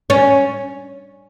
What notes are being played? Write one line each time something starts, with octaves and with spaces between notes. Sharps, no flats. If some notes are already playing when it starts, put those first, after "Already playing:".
C#4